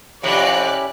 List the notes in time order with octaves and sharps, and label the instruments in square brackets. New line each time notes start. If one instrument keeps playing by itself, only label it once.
[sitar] F2 C3 [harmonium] C#4 E4 G4 [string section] C#5 D5 F#6